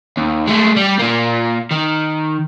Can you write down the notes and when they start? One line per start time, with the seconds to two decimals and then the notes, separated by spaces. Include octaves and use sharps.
0.18 D#2
0.47 G#3 A3
0.77 G3
1.00 A#2 A#3
1.71 D#3